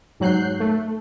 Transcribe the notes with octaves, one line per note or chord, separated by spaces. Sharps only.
G#2 F#3 F#6 G6 C7
A3